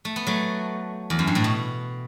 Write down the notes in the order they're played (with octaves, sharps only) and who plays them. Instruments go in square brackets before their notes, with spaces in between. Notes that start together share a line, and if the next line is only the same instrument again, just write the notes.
[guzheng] A3
B3
F#3 A3
E2
F#2
G2
A2
B2